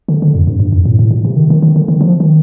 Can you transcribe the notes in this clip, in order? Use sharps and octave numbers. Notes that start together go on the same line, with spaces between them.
D3
D3
F2
G2
G2
F2
A2
A2
A#2
C3
D#3
D#3
D#3
D3
D#3
F3
D#3